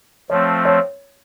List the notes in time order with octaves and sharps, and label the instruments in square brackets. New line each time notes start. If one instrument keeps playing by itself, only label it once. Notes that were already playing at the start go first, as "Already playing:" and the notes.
[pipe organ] F3 A3 C4 [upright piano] C#5
[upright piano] C#5